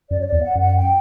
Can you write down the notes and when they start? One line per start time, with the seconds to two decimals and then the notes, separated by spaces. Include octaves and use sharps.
0.10 F#2 D5
0.20 C#5
0.27 D5
0.32 E2
0.43 F#5
0.55 F#2 F#5
0.77 G5